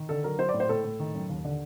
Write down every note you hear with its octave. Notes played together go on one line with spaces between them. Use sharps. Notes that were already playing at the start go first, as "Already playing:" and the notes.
Already playing: D#3
D3 A4
F#3 A#4
F#3 C5
D5
A2
C5
A2 A4
A2
D#3
F#2
D#2
D3